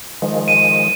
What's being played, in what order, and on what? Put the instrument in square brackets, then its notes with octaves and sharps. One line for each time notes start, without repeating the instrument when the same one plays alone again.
[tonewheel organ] D#3 F3 G#3
[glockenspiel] D#7